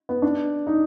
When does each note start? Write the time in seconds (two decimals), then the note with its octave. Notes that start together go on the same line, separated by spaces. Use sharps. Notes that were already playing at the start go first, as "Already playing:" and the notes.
0.09 B3
0.22 D4
0.67 D#4